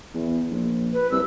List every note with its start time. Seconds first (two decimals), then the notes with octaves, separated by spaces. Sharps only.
0.14 E2
0.51 A#1
0.93 B4
1.11 C2 E6